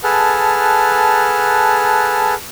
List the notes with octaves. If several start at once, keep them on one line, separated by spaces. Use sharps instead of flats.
G#4 A4 B4 F#5 A5 F6